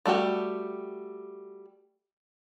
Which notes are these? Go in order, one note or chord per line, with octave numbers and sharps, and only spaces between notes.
G3 A3 F#4 G4